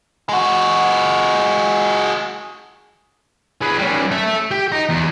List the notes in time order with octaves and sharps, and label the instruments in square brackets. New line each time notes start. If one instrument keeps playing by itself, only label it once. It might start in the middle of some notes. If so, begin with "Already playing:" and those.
[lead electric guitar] G#3 F#4
[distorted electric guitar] G#4 B4
G3 C#4
A4 E5
G4
D#5 A#5
E2